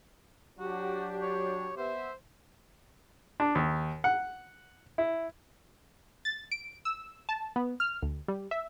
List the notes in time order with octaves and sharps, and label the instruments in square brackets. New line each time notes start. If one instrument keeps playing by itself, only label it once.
[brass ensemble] F#3 D4 [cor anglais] F#4 [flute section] G4
[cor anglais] C#5
[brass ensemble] B3 E5 [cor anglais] C5
[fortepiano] D4
D#2
F#5
E4
[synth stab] A6
D7
E6
A5
B3
F6
D2
G3
E5